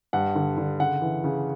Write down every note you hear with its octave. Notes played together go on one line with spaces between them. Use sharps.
G2 F#5
D3
D3
C#3 F#5
E3
C#3